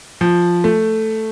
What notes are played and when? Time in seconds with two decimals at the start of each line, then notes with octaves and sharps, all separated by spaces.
0.21 F3
0.64 A3